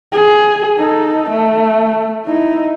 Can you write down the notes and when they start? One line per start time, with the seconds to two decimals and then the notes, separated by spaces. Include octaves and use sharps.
0.13 G#4
0.77 D#4 A4
1.30 A3
2.25 D#4 E4